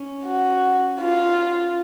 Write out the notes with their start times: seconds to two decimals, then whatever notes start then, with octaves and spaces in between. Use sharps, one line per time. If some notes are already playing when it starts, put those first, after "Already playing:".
Already playing: C#4
0.25 F#4
1.00 F4